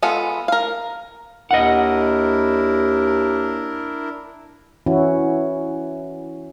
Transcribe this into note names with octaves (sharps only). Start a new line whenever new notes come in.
G#3 B3 F4 A4
A#4 F5
D#2 D4 E4 A#4 D#5 F#5
E3 C#4 E4 F#4